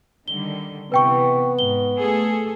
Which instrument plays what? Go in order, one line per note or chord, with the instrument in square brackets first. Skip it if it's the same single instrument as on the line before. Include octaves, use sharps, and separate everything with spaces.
[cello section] D3 D#3 G3 [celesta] G7
[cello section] C3 E3 [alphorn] B3 [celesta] B4 G5 C#6
[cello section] G#2 [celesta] G7
[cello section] A3 G#4 A4